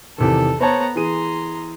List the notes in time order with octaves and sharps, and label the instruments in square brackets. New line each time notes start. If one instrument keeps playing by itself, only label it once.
[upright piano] E2 C3 D#3 [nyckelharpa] A4
[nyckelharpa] B3 A#5 [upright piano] C5 C#5 A5
[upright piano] E3 G#4 D#7 [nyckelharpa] A#5 C6